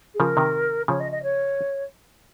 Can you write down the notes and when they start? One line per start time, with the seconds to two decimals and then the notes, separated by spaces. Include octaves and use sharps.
0.14 G#4
0.20 C#3 F3 A#4
0.37 C3 D#3
0.88 C#3 F3 C#5
1.00 D#5
1.11 D#5
1.23 C#5